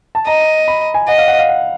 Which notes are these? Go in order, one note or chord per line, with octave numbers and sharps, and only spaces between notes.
A5
D#5 A#5
B5
G#5
D#5 F#5
F5
F#5
F5
F#5